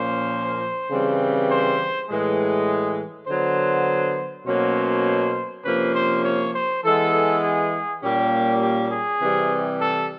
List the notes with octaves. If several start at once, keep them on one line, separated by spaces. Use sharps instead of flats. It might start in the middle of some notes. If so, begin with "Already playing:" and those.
Already playing: A#2 F3 A#3 C#4 C5
C#3 E3 G3 C4
C5
A2 E3 G#3
D3 F#3 B3 C5
B2 F#3 A#3 C#4 C5
C3 F3 A#3 C#4 B4
C5
C#5
C5
E3 G#3 B3 A4
G#4
A#2 G3 A#3 C#4 G4
G4
G#4
C3 E3 G3 C4
A4